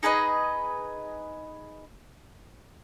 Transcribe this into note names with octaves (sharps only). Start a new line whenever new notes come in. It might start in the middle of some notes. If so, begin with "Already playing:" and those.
D#4 G#4 B4 D#5